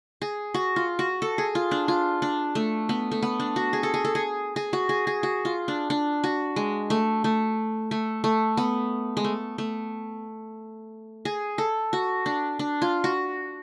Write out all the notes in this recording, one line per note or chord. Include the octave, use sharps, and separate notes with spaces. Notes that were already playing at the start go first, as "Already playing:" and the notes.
G#4
F#4
F4
F#4
A4
G#4
F4
D4
F4
D4
A3
B3
A3
B3
D4
F#4
G#4
A4
G#4
A4
G#4
G#4
F#4
G#4
G#4
F#4
F4
D4
D4
F#4
G#3
A3
A3
A3
A3
B3
G#3
A3
A3
G#4
A4
F#4
D4
D4
F4
F#4